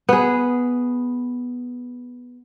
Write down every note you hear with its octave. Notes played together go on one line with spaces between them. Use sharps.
B3 G#4